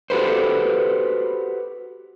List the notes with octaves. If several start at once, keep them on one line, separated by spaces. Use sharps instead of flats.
F#4 G4 A4 B4 C5